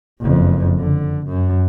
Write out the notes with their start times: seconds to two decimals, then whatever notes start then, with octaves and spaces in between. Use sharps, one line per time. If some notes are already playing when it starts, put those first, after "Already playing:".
0.21 F#1 F2
0.79 D3
1.27 F#2